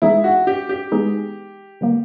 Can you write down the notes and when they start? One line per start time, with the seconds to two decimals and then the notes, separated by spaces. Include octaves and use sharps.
0.02 E3 G#3 B3 D#4 E4 G#4
0.24 F#4
0.47 G4
0.69 G4
0.92 E3 G#3 B3 D#4 G#4
1.81 D3 G3 A#3